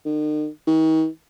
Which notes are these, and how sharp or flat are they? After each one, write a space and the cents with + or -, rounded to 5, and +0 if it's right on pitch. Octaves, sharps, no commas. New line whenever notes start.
D#3 -45
D#3 +40